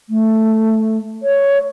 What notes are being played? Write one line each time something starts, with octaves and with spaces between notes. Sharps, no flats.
A3
C#5